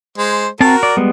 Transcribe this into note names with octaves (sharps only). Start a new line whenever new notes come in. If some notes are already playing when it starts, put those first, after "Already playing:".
G#3 C5
C4 F#4 A#4 A5
D5
G3 G#3 B3